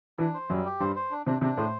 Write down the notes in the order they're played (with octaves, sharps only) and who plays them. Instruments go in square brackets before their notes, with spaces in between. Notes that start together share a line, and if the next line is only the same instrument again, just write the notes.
[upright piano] E3 E4 [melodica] D4
[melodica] C5
[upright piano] F#2 F#3 [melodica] G3
[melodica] G4
[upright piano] G2 G3 [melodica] C5
[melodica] C5
D4
[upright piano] C3 C4 [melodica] D4
[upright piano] C3 C4 [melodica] D4
[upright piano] A2 A3 [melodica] C5